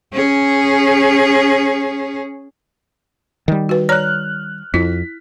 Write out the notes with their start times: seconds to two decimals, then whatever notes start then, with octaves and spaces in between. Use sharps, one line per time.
0.13 C#4 G#4
3.48 D#3 G3
3.69 F#4 B4
3.89 C#5 D5 A#5 F6 F#6
4.74 F2 E4 B6